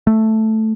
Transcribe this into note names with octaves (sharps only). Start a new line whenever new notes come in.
A3